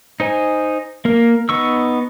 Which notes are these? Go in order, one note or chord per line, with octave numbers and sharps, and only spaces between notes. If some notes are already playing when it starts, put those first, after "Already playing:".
D#4 C5 G#5
A#3 A#4
B3 D#4 C#6 E6